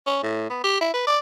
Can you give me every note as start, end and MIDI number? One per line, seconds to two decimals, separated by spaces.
0.07 0.21 61
0.23 0.45 45
0.50 0.60 59
0.64 0.78 67
0.81 0.89 64
0.93 1.06 71
1.07 1.19 74